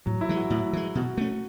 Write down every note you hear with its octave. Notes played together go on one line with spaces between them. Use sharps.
A2 F#3
E4
E3 G#3
F#4
A2 E4
E3 G#3
B2 F#4
A3 C#4